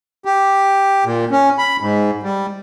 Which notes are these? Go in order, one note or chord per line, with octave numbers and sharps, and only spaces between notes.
G4
A#2
C#4
B5
G#2
G3